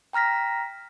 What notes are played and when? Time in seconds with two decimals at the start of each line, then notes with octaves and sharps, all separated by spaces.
0.13 G5 A#5 F6 A#6 B6